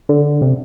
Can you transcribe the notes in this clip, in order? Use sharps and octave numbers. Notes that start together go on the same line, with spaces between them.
D3
C3